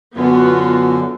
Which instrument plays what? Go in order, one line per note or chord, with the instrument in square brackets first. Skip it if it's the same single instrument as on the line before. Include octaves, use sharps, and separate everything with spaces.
[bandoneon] F#2 D3 [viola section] B3 F4 F#4